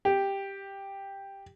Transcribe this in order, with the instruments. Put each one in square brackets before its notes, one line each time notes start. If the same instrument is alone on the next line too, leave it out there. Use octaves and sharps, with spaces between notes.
[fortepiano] G4